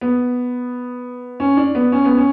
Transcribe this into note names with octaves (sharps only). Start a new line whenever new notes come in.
B3
C#4
D4
B3
C#4
B3
C#4